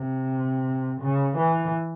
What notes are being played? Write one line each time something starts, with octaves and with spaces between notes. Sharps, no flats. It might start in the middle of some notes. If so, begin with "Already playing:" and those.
Already playing: C3
C#3
E3